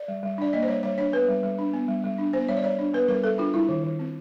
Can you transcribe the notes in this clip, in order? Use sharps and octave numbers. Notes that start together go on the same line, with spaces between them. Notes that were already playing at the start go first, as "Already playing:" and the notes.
Already playing: D5
G3
G3
D4 D5
A#3 D#5
C5
G3 C#5
G3 C#5
D4 C#5
B3 B4
G3
G3
D4
B3
G3
G3
D4
B3 C5
G3 C#5
D5
G3 C#5
D4
B3 B4
G3 A#4
G3 A4
D4 F4
G3 E4
D#3
D#3
C4